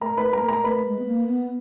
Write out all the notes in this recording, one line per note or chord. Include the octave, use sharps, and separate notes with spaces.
A3 A#4 A#5
A3 B4 B5
G#3 A#4 A#5
A#3
A3 A#4 A#5
A3 B4 B5
G#3
B3
A#3
B3